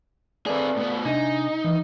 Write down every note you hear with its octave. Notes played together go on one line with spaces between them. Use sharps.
C4 G#4 A4 B4 D5
A2 B3
C3 D4 D#4 G#5
E3